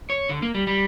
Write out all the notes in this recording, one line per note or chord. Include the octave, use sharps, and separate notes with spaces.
C#5
D3
A#3
G3
G3